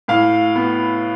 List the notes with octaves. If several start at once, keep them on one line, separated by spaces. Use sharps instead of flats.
A2 F5
B3